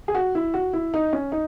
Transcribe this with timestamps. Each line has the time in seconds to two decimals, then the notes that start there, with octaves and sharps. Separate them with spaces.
0.08 G#4
0.15 F#4
0.35 E4
0.54 F#4
0.73 E4
0.94 D#4
1.13 C#4
1.32 D#4